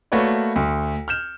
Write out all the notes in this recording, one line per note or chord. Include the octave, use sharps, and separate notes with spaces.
A3 A#3 F#4 B4 C#5 D5
D2
F6 G6 E7